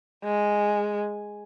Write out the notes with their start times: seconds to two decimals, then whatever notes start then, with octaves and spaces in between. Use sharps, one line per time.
0.24 G#3